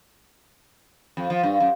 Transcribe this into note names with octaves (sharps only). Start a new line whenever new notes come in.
F2
F3
G2
F#2